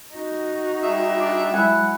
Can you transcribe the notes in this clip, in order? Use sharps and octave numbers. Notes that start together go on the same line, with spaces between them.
D#4 F#4
G3 G#4 E5
D4
F#3 G#3 E4 F#5 G#5